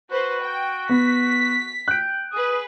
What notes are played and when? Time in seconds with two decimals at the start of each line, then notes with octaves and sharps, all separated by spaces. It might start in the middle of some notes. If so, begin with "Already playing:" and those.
0.11 F#4 B4 C5
0.41 G5
0.89 B3 B6
1.88 G5 F#6 D7
2.32 G#4 B4 D#6